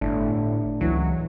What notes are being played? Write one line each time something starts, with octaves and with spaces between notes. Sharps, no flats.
G1 A2 A3 D4
C#2 E3 F#3